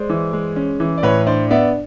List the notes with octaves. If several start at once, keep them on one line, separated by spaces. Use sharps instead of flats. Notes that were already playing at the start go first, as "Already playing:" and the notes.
Already playing: G#3 C5 D5
E3
G#3
C#4
E3
D5
A2 B4 C#5
D4 C5 D5
B3 D5 E5